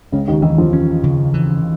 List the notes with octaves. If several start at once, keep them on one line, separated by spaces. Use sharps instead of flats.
C#2 C#3 G#3
D#2 D#3
D#2 D#3 E3
F2 F3
C#4
C#3
E3